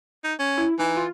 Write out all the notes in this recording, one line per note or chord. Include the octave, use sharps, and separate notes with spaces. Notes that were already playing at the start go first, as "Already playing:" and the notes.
D#4
C#4
E4
E3 D#4
F4